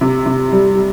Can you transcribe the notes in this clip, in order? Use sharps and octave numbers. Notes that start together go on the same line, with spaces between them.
C3
C3
G3
G3